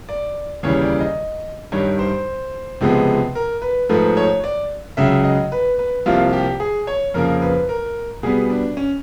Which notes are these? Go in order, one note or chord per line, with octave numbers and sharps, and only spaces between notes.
D5
D#2 C#3 E3 G3 C#5
D5
D#5
G2 D#3 G3 C#5
C5
C#2 C3 F3 G#3 B3
A#4
B4
G#2 F3 A3 B4
C#5
D5
C#2 C#3 F#3 E5
D#5
B4
B4
C2 C3 F3 A#3 F4
G4
G#4
C#5
F2 C#3 F3 A#3 A#4
B4
A#4
B2 G3 B3 G#4
D4
C#4